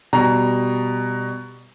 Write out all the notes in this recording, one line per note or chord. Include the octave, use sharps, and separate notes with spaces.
B2 G3 A#5